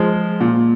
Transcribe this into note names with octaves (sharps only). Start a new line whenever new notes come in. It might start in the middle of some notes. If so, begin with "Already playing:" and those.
Already playing: F3 G#3
A#2